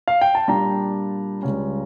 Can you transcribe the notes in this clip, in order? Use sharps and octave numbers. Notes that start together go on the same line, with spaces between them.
F5
G5
A5
A#2 G3 D4 F4 A#5
C#2 C#3 G3 C#4